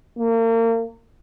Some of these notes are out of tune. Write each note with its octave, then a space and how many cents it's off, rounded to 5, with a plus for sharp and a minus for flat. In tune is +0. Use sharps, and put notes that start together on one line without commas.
A#3 -35